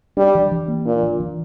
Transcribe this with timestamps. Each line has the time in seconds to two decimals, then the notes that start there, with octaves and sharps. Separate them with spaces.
0.17 G3 D4
0.35 E3
0.52 E3
0.68 A#3
0.86 A#2 D4
1.03 E3
1.20 E3